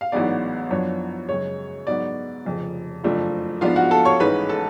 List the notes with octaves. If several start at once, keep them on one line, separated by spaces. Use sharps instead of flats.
F5
A1 G#2 F#3 B3 D5
F#2 F3 B3 D4 C#5
F#2 C#3 G#3 C#5
G#2 F#3 B3 D5
F1 F2 C#3
F#1 F2 F3 A3 D4
G#2 F3 B3 D4 F4 F5
F#4 F#5
A4 A5
C#5 C#6
A1 G#2 G#3 C#4 B4 B5
A4 A5